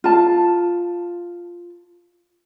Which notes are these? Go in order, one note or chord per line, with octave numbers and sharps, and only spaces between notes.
F4 A5